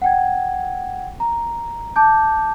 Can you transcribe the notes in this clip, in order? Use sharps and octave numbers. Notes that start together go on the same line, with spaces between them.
F#5 G5 G#6
A#5
A5 D6 G6